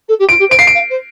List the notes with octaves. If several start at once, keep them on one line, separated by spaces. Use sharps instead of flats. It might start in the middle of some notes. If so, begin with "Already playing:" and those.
A4
G4
F4 D7
G4
C5
D7
F5 C7
D7
F5
C5